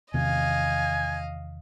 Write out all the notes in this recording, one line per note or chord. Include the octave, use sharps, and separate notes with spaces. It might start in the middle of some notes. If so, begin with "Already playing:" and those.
E2 C3 D#3 D#5 F5 G#5